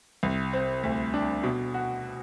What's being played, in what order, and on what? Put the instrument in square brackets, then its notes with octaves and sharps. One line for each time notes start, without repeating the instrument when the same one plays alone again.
[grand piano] C2
C4
D2
D4
B2
F#4